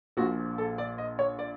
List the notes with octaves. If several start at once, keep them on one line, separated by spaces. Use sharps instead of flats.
A#1 A#2 F3 F#4
A4
D5
D#5
C#5
D5